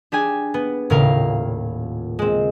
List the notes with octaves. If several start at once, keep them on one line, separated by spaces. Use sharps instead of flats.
D4 G4 G#4 G#5
B3
D#1 A2 C#3 A#4 F5
G#3 C4